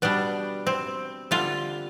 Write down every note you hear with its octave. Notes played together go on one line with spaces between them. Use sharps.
B2 G3 D4
C4
D3 G3 F4